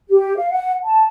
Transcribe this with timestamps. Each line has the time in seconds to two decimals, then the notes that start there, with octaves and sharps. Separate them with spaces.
0.09 G4
0.36 F5
0.51 F#5
0.83 A5